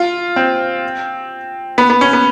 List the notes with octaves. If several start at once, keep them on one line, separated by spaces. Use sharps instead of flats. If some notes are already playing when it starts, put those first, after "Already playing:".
Already playing: F4
C4
B3
B3
C#4
B3